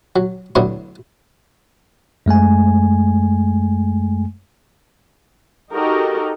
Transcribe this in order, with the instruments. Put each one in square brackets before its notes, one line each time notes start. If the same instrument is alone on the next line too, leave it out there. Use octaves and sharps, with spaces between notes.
[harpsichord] F#3
A2 D3 F#3 B3 D4 E4
[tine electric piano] F#2 G#3 A3 G#5
[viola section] D#4 F#4 G4 A4 A#4 D#5